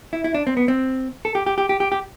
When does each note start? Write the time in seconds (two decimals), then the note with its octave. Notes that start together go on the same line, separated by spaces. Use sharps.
0.13 E4
0.24 E4
0.34 D4
0.47 C4
0.57 B3
0.68 C4
1.25 A4
1.35 G4
1.46 G4
1.58 G4
1.69 G4
1.80 G4
1.92 G4